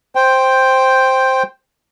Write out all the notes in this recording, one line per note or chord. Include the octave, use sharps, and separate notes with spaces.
C5 G5